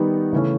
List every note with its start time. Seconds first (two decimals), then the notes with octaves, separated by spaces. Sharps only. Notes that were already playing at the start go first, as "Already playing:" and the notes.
Already playing: D#3 G3 B3 D#4
0.33 C#3 E3 A3 C#4